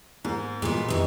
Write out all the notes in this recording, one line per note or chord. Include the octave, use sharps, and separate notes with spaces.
G#2 A#3
A#2 F#3 G#3 B3
F2 E3 D#4 G#4 C#5